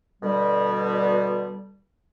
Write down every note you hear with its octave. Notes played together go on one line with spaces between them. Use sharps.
B2 D3 G3